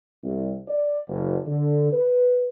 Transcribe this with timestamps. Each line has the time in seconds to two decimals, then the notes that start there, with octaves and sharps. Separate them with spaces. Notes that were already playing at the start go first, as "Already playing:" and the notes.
0.23 C2
0.68 D5
1.08 F#1
1.45 D3
1.92 B4